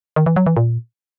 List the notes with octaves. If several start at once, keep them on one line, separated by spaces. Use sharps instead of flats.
D#3
E3
F#3
E3
A#2